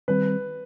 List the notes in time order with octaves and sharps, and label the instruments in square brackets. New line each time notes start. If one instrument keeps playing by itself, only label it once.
[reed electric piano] D#3 G3 C4 [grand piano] B4